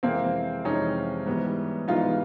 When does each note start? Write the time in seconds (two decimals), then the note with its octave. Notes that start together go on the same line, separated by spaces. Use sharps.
0.03 F2 C3 E3 G#3 A#3 C4
0.64 F2 C3 E3 G#3 C#4 D#4
1.26 G#2 E3 G3 B3
1.88 G#2 E3 G3 B3 D#4 F4